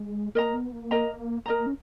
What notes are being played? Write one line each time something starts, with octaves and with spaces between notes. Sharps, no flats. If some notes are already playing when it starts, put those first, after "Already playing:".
Already playing: G#3
A#3 A#4 D#5 A#5
B3
A#3
A#4 D#5 A#5
A#3 A#4 D#5 A#5
C#4